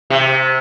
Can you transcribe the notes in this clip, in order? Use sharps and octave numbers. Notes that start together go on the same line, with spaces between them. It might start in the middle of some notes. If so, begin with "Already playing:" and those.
C3